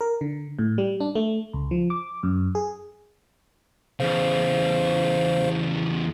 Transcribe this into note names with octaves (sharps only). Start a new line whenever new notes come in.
A#4
D3
A2
G3
D4
A3
C#2
F3
D6
F#2
G#4
E2 C#3 C5 F5